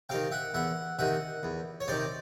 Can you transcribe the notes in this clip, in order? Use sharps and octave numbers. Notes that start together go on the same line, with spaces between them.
C3 D#3 F5 G5
E5 F#5
E2 E5 F#5
C3 D#3 E5 F#5
E2
C#5
C3 D#3 C5 D5